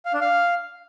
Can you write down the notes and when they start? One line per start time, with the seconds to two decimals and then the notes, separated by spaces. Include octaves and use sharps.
0.05 F5
0.13 D4
0.21 F5